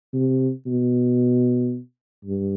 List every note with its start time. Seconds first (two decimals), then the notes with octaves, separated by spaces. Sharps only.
0.14 C3
0.67 B2
2.25 G2